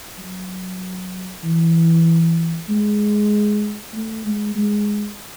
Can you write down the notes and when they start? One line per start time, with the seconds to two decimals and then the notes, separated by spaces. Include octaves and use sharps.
0.19 F#3
1.44 E3
2.69 G#3
3.94 A3
4.25 G#3
4.56 G#3